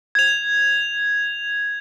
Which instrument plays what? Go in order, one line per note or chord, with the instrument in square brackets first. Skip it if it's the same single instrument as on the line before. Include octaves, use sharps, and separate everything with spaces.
[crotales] G#6 F7